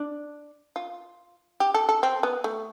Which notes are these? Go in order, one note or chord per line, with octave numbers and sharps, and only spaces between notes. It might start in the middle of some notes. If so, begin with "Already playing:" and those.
Already playing: D4
F4
G4
A4
A4
C4
B3
A3